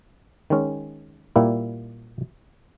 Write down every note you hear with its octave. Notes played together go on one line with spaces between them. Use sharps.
D#3 G#3 C#4
A#2 G3 A#3 E4